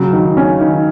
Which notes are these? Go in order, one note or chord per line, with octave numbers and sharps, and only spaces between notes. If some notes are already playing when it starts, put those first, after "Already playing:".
Already playing: C#3 F#3
D#3
C#4
D#3